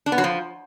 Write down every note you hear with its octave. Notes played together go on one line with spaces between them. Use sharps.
D4
B3
F#3
F3